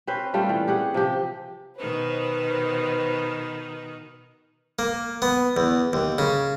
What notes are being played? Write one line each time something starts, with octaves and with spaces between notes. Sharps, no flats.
C4 C#4 B4 C5
G3 A3 F4 G5
E3
G4 G#4 F#5
C3 F3 G4
B2 D#3 D#4 B4 C5
A#3
B3
E2
D#2
C#3